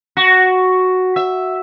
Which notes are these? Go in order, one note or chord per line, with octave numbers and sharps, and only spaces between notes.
F#4
E5